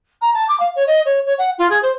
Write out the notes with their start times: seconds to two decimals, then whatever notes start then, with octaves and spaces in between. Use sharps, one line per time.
0.21 A#5
0.33 A5
0.48 D6
0.59 F5
0.75 C#5
0.87 D#5
1.05 C#5
1.25 C#5
1.38 F#5
1.58 F4
1.70 G#4
1.82 C5